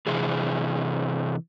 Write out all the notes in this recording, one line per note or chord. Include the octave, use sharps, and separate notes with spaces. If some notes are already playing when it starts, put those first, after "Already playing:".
C3 E3 G#4